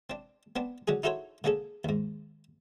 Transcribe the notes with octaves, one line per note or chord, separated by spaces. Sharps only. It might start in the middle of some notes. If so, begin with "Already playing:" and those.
C4 D4
B3 C4 D4
D3 F#3 C#4 G#4
D#4 E4 F#4 A4 C5 C#5
D3 A#3 C#4 G#4 A4
D#2 G#2